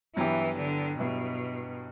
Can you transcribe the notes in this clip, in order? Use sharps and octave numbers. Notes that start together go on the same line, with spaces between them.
G2 E3 F#3 B3 E4 G4
D3
G2 B2 F#3 B3 E4 G4